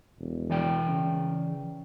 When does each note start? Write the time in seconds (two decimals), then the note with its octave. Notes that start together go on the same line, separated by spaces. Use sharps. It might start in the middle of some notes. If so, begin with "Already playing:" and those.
0.20 E1
0.50 E3 D5 G5
0.87 C#3